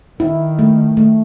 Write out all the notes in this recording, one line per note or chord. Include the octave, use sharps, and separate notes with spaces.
D#3 E4
A3
A3